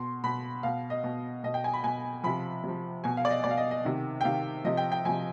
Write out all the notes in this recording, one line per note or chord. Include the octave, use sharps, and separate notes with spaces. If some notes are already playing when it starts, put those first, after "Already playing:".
Already playing: B2 C6
B2 B5
B2 F5
D#5
B2
B2 D#5
G5
G#5
B5
B2 G#5
C3 F3 B5
C3 F3
B2 G#5
F5
D5
D#5
B2 D5
F5
D#5
D#5
C3 D#3
G5
C3 D#3 F5
C3 F3 D#5
G5
G5
C3 F3 G#5